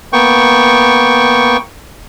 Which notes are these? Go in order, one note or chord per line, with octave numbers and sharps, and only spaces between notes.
A#3 B3 G5 C#6